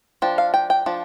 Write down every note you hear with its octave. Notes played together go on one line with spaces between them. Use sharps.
F3 D4 G5
F5
G5
G5
F3 D4